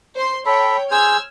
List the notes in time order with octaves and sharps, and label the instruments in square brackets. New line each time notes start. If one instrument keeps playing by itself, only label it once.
[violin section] C5 C6
[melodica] A4 B5 [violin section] C#5 G5
[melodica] G#4 C5 [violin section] E6 F6 G#6